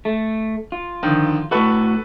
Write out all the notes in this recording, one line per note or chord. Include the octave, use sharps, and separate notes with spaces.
A3
F4
D3 D#3 F3
A2 F#4 A4 B4 C#6